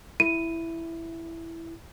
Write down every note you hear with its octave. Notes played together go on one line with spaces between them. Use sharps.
E4 D#7